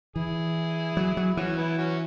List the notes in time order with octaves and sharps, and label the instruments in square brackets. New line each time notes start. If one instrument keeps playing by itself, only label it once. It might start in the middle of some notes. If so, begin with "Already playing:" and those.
[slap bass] E3 [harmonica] E4 G#4
[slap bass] F#3
F#3
[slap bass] E3 [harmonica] C#4 F#4
[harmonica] B3 E4
C#4 F#4